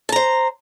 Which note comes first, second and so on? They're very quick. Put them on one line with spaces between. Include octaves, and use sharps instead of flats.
A5 A#5 C5